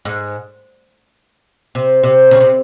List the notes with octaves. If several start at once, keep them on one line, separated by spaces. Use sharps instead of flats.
G#2
C3
C3
C#3
C3